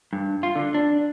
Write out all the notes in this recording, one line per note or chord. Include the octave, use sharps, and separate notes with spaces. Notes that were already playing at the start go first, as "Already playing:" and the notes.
G2
F4
D3
D4